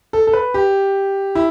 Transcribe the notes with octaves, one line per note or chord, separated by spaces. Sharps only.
A4
A4
B4
G4
E4